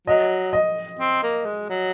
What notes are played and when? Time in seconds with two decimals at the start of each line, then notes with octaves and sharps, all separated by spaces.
0.07 F#3 D#5
0.53 D#5
0.99 C4
1.23 A#3
1.46 G#3
1.70 F#3